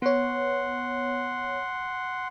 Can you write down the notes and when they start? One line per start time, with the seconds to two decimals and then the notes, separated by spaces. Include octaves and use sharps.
0.02 B3 C#5 F#5 C6